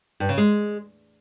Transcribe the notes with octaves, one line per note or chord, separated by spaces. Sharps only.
G2
C#3
G#3